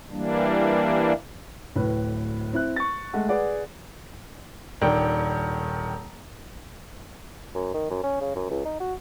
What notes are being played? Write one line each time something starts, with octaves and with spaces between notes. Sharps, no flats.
E3 G3 A#3 D4
D1 A2 B4
C4 E4 F#6
C#6 A6
G#3 A3 F#5
G#4 B4 D5 F#5
D#1 D#3 D4 G5
F#2
D#3
F#2
C#4
C#3
F#2
C#2
D#4
F#4